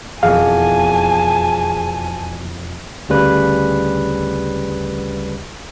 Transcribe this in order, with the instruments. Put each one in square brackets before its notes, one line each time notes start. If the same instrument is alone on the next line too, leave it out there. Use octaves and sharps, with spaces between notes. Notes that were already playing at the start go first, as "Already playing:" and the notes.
[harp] E1 F2 B3 [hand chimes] G#4 [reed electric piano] F5 [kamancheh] G#5 A5
[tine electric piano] D2 C#3 G3 B4